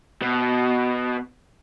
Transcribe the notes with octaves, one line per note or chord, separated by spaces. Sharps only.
B2